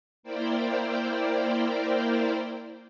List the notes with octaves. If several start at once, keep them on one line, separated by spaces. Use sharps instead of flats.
A#3 E4 A#4 C5 D5 G5